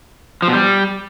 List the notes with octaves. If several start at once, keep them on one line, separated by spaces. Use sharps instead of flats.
F3
B2
G3